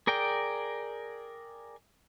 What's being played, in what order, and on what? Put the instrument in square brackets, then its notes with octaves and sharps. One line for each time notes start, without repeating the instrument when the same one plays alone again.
[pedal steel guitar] G#4 A#4 D5 G5